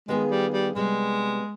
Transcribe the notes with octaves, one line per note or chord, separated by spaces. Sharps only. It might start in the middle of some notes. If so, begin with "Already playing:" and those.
D#3 G#3 B3 F4 G#4
G3
G3
C3 G3 G#3 B3